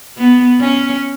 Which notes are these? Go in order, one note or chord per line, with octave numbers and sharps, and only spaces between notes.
B3
C#4